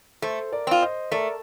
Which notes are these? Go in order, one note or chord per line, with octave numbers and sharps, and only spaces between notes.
A3 A4 C5
A#4 D5
C4 F4
C5 D#5
A3 A#4 D5